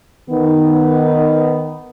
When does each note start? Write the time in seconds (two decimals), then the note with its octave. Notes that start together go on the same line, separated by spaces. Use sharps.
0.29 D#3 B3